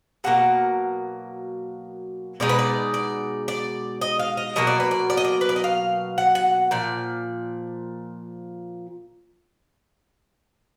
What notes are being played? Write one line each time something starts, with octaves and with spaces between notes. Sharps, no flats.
B2 F#3 A#3 F#5
B2 G#3 D#4 D5
B4
D5
D5
D5
D#5
F5
D#5
B2 F#3 A#3 D#5
D5
B4
D5
D5
D#5
D5
B4
D5
D#5
F5
F#5
F#5
A#2 F3 D5